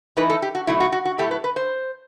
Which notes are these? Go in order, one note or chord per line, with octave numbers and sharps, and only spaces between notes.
E3 A3 D#4 B4
A4
G4
F#4
B2 F#3 A3 D#4 E4
F#4
F#4
F#4
A2 F#3 A3 E4 G4
B4
B4
C5